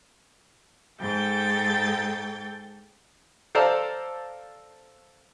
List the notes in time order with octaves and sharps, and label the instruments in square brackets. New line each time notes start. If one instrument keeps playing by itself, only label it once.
[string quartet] G#2 A4 G5 G6 A6
[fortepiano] A4 C5 D5 F5 A5 A#5